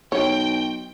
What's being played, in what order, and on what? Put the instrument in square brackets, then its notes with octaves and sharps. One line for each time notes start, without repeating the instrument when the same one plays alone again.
[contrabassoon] B1 [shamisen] C#5 [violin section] G5